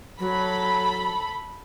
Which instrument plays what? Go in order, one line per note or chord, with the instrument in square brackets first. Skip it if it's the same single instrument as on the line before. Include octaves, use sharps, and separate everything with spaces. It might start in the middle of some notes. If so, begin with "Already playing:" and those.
[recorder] F#3 [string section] A4 B5